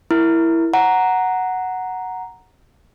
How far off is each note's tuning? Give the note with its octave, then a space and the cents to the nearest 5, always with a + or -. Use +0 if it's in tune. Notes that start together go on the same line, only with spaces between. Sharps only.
E4 +0 A#4 +0
F#5 +0 A#5 +0